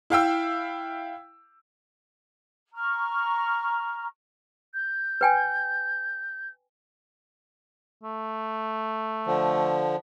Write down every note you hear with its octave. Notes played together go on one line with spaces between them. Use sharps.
E4 F5 G5 E6
A#5 C#6 F6
G6
B4 G5 G#5
A3
D3 F3